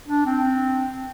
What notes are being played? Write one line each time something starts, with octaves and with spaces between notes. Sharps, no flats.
D4
C4